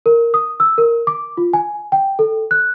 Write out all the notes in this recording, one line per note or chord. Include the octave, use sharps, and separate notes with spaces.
A#4
D#6
E6
A#4
D6
F4
G#5
G5
A4
F#6